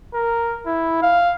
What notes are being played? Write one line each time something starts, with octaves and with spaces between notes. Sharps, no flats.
A#4
E4
F5